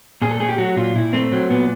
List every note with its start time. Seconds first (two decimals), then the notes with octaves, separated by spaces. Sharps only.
0.22 A#2 G#4
0.31 A4
0.40 A3 G#4
0.49 G4
0.58 F#3 F#4
0.76 A#2 F4
0.95 A#2 E4
1.13 A3 C4
1.32 F#3 C4
1.50 A#2 B3